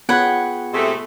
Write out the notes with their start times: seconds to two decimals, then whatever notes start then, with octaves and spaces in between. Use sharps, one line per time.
0.09 B3 F4 G#4 C#5 F#5 G5 B5 F#6
0.73 C3 G#3 A3